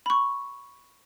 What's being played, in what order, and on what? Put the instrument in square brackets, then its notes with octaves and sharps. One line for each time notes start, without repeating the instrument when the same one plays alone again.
[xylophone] B5 C#6